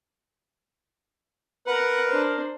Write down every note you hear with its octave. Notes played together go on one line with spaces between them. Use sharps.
A#4 B4 F#5
D4 C5